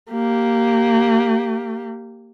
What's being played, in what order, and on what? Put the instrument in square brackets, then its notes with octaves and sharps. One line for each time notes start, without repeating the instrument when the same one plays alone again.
[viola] A#3 G4